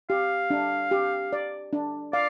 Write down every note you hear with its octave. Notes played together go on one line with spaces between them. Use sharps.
G4 F5
D4
G4
D5
D4
D5 F5